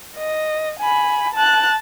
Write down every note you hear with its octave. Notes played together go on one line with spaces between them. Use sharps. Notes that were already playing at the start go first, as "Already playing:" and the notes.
D#5
G#5 B5
A5 F#6